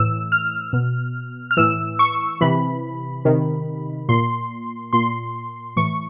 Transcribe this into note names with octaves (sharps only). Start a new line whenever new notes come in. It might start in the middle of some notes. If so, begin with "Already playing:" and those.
Already playing: A2 E3 E6
F6
B2
F6
A2 E3 E6
C#6
C3 E3 B5
C3 D#3
A#2 C6
A#2 C6
A2 E3 C#6